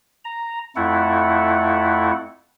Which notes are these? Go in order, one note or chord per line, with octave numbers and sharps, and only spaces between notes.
A#5
F2 A3 E4 F#5